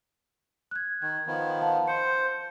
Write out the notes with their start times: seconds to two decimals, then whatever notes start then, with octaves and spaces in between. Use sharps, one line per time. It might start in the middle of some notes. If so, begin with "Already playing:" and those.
0.71 F#6 G#6
1.02 D#3 G#6
1.27 D#3 F3 B3
1.61 F5 F#5 A5
1.88 C5 C#7